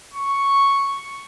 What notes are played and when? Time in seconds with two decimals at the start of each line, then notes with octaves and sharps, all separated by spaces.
0.14 C#6